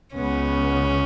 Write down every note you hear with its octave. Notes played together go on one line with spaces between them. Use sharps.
C#2 C#3 B3 C#4